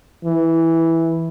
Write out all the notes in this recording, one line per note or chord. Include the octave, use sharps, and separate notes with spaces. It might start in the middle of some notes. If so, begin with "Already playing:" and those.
E3